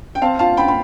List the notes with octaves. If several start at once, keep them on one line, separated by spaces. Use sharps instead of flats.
G5
C4 F5 A5
F4 F5 A5
F4 G5 B5
B5